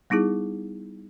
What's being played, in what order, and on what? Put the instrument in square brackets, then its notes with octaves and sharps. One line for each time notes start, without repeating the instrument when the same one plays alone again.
[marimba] G3 B3 D#4 E4 G#4